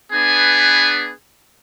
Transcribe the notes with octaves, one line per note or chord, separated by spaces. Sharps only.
B3 D4 G#4 B4 G#5